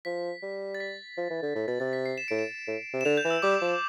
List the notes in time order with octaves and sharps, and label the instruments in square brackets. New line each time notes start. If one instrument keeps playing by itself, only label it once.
[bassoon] F3 [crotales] B6
[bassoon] G3
[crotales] A6
B6
[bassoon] F3
E3
D3
A2
[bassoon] B2 [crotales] A6
[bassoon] C3 [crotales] A6
[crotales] B6
C7
E7
[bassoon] A2 [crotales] D7
[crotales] E7
[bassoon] A2
C3
[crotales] E7
[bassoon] D3 [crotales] F7
[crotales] G6
[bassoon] E3
[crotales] E6
[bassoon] G3 [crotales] D6
[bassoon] F3